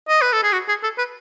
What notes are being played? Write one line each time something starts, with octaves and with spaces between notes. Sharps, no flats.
D#5
B4
A4
G#4
F#4
G#4
A4
B4